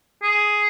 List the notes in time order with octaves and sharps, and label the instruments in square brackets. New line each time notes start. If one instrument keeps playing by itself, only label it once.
[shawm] G#4